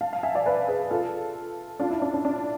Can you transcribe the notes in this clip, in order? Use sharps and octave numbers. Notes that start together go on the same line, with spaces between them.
F5 A5
F5 A5
E5 G#5
D5 F5
B4 D5
G#4 B4
F4 A4
D4 F4
E4
D4
D4
D4